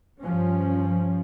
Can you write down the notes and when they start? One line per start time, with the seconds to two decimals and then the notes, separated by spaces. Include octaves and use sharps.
0.23 G2 F3 C#4